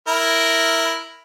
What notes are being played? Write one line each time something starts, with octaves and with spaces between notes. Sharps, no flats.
E4 A#4 A#5